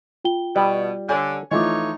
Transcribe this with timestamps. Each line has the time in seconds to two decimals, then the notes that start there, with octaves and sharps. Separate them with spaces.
0.25 F4 G5 G7
0.56 B2 G3
1.09 D3 C#5 G#5
1.51 E3 F3 A3 D#4 F4 C#5 D#5 D6